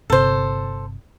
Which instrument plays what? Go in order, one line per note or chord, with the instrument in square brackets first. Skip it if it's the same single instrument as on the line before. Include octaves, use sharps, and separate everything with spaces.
[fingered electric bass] G1 C3 [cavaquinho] A4 C5